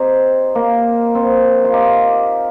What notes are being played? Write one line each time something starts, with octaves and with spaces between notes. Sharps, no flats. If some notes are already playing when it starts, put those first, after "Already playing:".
Already playing: C4 D#4 G4
A#3
C4
F4
D#4 G4